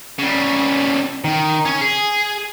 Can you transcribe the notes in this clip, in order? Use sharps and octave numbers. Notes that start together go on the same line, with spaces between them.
C#3 G3
D#3
C#4 C#5
G#4